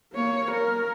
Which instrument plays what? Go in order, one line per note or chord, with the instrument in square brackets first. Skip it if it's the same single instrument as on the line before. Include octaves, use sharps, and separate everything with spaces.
[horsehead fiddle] A#3 C#5
A#4